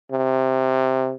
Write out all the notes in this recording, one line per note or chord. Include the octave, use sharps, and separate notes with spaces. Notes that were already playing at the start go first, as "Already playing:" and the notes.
C3